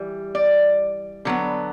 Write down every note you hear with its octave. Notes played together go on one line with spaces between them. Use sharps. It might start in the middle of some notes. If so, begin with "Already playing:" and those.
Already playing: E3 G3
D5
D3 F#3 B3